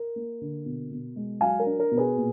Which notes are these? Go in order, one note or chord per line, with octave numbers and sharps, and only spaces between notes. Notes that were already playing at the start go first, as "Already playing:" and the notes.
Already playing: A#4
A#3
D3
B2
B2
G#3
F#3 F5 G#5
A#4
D4
A#4
B2
G#4 B4
A#2